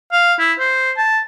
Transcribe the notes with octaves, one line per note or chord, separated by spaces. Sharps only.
F5
E4
C5
A5